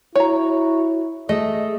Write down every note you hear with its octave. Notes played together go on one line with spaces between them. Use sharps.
E4 F#4 C#5 A#5
A3 G#4 D#5